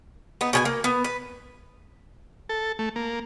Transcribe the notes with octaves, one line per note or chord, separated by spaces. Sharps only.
B3 D#4
B2 G#4 G#5
A#3
B3
B4
A4
A3
A#3